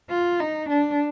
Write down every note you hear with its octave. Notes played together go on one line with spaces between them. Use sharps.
F4
D#4
D4